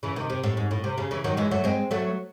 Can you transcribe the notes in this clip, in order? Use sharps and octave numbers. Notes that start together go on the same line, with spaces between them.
C#3 E3
C3 D#3
C3
A2
G#2
A2
C3
C#3
C#3 E3
D#3 F#3
E3 G#3
F#3 A3
G#3 C4
F#3 A3